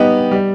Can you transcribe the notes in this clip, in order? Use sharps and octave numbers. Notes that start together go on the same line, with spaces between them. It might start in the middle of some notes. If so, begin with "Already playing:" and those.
Already playing: G3 B3 D#4 G4
G3